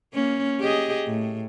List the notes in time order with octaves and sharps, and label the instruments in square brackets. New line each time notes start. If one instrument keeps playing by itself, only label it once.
[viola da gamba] A#3 C#4
G4 G#4 D#5
A2